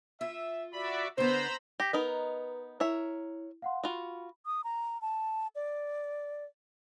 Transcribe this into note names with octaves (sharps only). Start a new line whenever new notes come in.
F4 E5
F#4 D5 E5 B5
D3 B3 C5 A#5 B5 E6
G4 A#6 B6
B3 D#4 A#4 B4 D#5
E4 A#4 C#5 E5
F5 F#5 C6
F4 F#4 B5
D#6
A#5
A5
D5